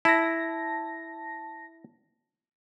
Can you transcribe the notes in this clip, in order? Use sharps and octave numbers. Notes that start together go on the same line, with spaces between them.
E4 A5 A#6